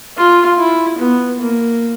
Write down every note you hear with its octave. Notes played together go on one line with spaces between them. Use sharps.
F4
E4
B3
A#3